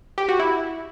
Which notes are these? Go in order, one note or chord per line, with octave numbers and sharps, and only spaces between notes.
G4
F#4
E4